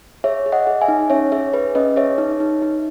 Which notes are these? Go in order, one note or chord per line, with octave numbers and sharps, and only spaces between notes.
G#4 C#5 E5
G#4
D#5 F#5
G#4
E5 G#5
D#4
C#4 C#5 E5
G#4 C#5 E5
G#4 B4
C#4 B4 D#5
G#4 C#5 E5
D#4
D#4
D#4